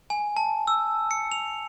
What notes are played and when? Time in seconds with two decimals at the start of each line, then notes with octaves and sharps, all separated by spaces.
0.10 G#5
0.37 A5
0.67 E6
1.11 C#7
1.32 F7